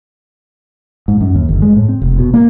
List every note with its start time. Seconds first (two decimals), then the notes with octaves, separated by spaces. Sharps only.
1.08 G#2
1.21 F#2
1.35 D#2
1.49 G1
1.62 G#3
1.76 A2
1.89 C4
2.02 F1
2.18 B2
2.34 A#3